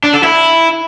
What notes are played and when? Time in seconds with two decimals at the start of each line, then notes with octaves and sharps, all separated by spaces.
0.04 D4
0.14 A4
0.24 E4